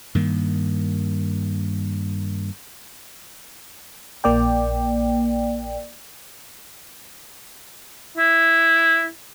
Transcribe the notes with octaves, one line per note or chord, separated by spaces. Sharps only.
G2 D#3 A#3
A#1 A#3 D5 G5
E4